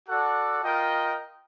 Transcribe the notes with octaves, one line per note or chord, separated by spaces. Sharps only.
F#4 A4 D5 F#5
F4 A#4 D#5 G5